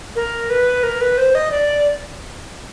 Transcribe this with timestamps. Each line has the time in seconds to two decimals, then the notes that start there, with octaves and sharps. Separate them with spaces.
0.16 A#4
0.50 B4
0.83 A#4
1.01 B4
1.18 C5
1.35 D#5
1.51 D5